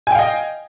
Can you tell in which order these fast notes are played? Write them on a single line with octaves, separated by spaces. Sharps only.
G#5 G5 F5 D#5